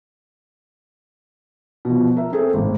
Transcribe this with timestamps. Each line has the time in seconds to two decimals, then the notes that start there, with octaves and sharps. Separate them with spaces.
1.85 B2 F3
2.17 A#4 E5
2.32 C4 G#4 A4
2.54 G#1 A2